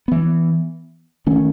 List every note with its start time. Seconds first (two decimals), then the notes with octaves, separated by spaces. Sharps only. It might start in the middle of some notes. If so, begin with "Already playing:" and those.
0.08 E3 B3
1.27 D#3 A3 C#4